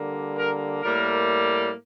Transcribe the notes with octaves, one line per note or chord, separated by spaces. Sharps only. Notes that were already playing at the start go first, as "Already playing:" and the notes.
Already playing: D3 G3 A#3
A#4
A2 G3 A#3 A#4